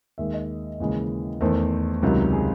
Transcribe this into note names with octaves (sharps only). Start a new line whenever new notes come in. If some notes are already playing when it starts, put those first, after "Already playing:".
D#2 D#3 G#3 E5
D#5
D#2 C#3 E3 G#3
E2 D#3 A3 C5
C#2 C3 D#3 F#3
G#4